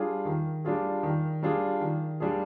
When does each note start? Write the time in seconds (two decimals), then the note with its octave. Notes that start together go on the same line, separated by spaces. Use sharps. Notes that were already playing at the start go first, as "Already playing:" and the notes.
Already playing: G3 D4 F4 G#4
0.25 D#3
0.65 G3 D4 F4 G#4
1.03 D#3
1.43 G3 D4 F4 G#4
1.81 D#3
2.20 G3 D4 F4 G#4